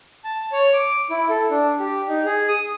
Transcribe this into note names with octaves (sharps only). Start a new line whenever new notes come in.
A5
C#5
D6
E4
A4
D4
G4
D#4
G#4
D#6